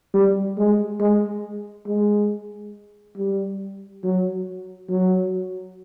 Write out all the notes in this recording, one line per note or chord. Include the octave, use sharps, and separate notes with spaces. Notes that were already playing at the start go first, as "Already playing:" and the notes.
G3
G#3
G#3
G#3
G3
F#3
F#3